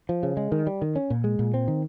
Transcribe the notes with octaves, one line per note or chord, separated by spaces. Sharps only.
F3
C#3
G#3
D#3
G3
D#3
C#4
A#2
G#3
A#2
C4
D#3